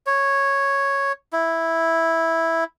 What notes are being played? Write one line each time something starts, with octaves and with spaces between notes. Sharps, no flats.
C#5
E4